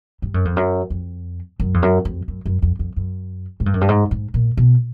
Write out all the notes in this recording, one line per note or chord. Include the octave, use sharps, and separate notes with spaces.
G2
F#2
F2
F#2
F2
F#2
F2
F#2
F2
F#2
F#2
F2
F2
F#2
G#2
G2
F#2
G2
G#2
G#2
A#2
B2